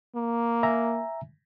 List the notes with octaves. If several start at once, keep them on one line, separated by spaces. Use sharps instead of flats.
A#3
E5 G#5 A#5